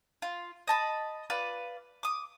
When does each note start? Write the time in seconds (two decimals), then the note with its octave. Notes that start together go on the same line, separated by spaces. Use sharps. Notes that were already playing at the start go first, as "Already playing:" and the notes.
0.22 F4
0.68 D#5 A5 B5
1.30 F4 B4 D5
2.03 D6 D#6